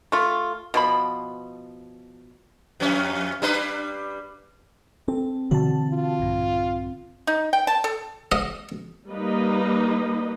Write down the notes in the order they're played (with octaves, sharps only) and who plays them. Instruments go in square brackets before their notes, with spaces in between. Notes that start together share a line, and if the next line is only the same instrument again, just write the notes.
[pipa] A3 F4
B2 F3 B5
[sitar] F2 C#4
G3 D4 B4
[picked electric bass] C4 [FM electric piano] A4
[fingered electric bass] B2 D3 E3 [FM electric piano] F#4 A5
[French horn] F4
[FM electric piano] A#1 G2
[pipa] D#4
G5
A5
A4
[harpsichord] D#5
[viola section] G3 A#3 D#4 B4 D#5